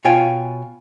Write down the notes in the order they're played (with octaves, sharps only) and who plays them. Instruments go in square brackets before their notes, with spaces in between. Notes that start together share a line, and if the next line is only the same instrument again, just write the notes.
[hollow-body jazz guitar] B2 F4 C#5 G5 G#5